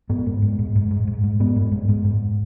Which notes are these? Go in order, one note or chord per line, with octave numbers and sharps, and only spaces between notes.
G#2 B3
G#2
G#2
G#2
G#2
G#2
G#2
G#2
G#2 B3
G#2
G#2
G#2
G#2